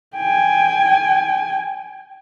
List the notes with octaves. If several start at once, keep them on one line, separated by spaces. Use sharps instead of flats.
G5 G#5